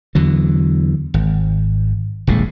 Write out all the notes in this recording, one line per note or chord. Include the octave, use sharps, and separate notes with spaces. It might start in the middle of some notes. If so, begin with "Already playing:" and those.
E2 D3 F#3
G#1
D#1 A#1 A2 G#3